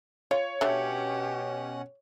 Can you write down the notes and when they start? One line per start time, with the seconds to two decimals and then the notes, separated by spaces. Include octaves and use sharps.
0.31 F4 C#5
0.61 B2 D3 A3 C#4 G4 F#5